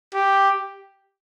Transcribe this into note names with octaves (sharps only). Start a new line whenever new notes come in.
G4